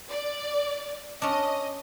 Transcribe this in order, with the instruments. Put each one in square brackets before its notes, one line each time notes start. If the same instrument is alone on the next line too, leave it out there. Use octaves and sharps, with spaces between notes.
[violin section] D5
[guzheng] C#4 D4 [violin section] D#5